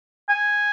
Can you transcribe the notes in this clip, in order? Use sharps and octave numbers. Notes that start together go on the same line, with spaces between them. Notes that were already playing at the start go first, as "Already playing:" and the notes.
G#5